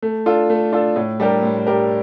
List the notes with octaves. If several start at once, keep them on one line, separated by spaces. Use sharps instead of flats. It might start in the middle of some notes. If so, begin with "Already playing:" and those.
A3
D4 F4 A4
A3
D4 F4 A4
A2
G3 D4 G4 A#4
A2
G3 D4 G4 A#4